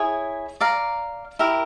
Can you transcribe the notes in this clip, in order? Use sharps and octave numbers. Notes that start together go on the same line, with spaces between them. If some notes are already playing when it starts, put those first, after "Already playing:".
Already playing: E4 G#4 C#5
D5 F5 A#5
E4 G4 A#4